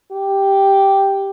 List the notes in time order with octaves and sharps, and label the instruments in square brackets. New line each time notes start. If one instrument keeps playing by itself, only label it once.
[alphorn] G4